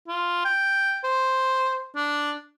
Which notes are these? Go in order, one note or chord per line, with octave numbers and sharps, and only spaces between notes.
F4
G5
C5
D4